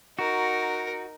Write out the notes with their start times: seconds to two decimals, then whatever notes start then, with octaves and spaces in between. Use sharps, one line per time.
0.19 D#4 F#4 A#4